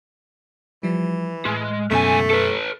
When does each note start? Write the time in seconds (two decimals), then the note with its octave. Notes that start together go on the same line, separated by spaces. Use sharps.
0.83 E3 F3 G3
1.45 A2 G#3 F6 F#6
1.91 C#2 F#2 B2 A3 C#4 G#5
2.30 A4 B4